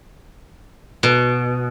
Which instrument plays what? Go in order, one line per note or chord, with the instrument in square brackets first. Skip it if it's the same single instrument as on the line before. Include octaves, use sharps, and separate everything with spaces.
[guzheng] B2